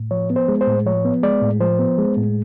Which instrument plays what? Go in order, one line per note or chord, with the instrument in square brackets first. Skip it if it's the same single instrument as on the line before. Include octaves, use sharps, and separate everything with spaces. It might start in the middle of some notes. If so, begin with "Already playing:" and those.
Already playing: [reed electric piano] A2
F3 C#5
B3
C5
G#3
C5
A2
F3 C#5
B3
G#3 D5
A2
F3 C5
B3
G#3
A2